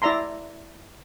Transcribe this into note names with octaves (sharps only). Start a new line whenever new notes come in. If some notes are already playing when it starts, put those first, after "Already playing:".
E4 D5 E5 A#5 C6